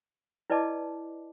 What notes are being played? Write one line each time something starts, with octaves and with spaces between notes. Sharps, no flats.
E4 B4 D5 D#5 A5 D6